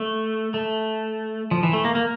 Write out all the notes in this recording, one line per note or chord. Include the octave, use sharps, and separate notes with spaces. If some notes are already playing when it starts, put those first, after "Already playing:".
Already playing: A3
A3
F3
E3
A3
A#3
A#3